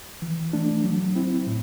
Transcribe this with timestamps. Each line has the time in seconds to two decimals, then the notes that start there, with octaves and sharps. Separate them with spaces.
0.22 E3
0.53 A3 D4
0.84 F#3
1.15 C4 E4
1.47 A2